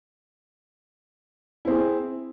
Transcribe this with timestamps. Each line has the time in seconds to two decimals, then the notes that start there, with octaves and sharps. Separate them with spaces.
1.65 E4
1.67 C4
1.70 G#4